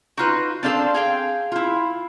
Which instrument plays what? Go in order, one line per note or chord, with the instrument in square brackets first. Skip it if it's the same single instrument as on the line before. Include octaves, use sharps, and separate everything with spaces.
[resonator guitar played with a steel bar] D#4 F4 B4 [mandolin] F#4 F#6
[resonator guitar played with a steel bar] C4 D4 A4 [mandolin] C5 F5 A5
[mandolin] G#4 F5 G5
[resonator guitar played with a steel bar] E4 F4